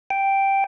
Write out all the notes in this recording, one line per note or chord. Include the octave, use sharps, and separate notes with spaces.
G5